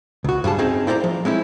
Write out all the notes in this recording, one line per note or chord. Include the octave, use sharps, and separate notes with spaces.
C#2 F#4
G2 G3 G#4 A5
C4 C#4 D#4 G#4
E4 C5 D5 F#5 A#5
F3
G#3 C4 C#4 E4